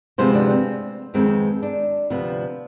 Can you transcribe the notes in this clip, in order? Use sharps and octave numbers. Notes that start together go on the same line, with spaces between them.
D2 C3 F3 G#3 B3 C5
D4
C4
F2 D#3 G#3 B3 C4
D4
D2 C3 F3 B3